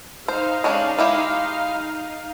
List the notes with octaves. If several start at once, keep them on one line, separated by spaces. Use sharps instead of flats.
D#4 C5 F5
G#3 C#4 D4
G#3 E4 G4